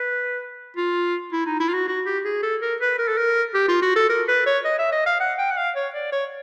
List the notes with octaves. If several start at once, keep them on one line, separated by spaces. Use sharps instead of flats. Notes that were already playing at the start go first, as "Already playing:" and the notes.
Already playing: B4
F4
E4
D#4
E4
F4
F#4
F#4
G4
G#4
A4
A#4
B4
A#4
A4
A#4
G4
F4
F#4
A4
A#4
B4
C#5
D#5
E5
D#5
F5
F#5
G5
F#5
F5
C#5
D5
C#5